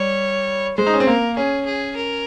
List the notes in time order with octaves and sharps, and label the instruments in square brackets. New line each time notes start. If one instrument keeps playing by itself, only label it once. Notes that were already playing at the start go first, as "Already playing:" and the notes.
Already playing: [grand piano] G3 [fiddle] C#5
[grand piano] G#3 [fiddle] C5
[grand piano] D#4
C#4
C4
[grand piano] A#3 [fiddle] A#4
[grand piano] C#4 [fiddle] G#4
[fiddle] G#4
A#4